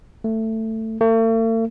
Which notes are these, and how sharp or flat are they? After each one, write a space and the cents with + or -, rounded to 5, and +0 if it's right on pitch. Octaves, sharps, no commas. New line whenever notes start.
A3 +15
A3 +45